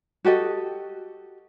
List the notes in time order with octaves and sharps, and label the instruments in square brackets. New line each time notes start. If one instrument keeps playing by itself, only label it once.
[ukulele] F#4 G4 A4 D#5